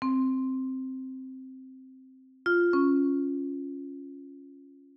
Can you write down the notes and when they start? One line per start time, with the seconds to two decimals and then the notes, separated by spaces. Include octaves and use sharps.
0.02 C4
2.46 F4
2.73 C#4